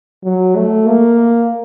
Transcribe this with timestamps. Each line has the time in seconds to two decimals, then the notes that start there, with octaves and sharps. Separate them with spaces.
0.24 F#3
0.56 A3
0.87 A#3